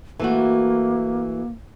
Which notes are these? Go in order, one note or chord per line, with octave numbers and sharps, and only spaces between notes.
E3 A3 A#3 F#4